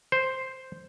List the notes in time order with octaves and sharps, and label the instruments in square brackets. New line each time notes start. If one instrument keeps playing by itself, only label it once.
[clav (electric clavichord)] C5